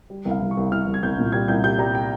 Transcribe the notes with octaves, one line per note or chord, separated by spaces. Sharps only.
G3
C2
F5
C2
C#6
C2
C2 F6
C2
G#6
C2 G6
A#2
G3 G#6
C2 G6
G3 G6
G3 A#5
G5